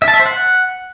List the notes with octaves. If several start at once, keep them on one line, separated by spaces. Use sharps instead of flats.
E5
A5
E5
C5
F#5